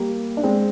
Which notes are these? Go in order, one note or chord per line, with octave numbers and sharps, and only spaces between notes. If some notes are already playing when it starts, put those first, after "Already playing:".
Already playing: G3 A#3
D4
G#3 C4